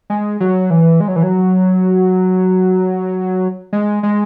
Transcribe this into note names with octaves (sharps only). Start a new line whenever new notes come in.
G#3
F#3
E3
G#3
F#3
E3
F#3
G#3
G#3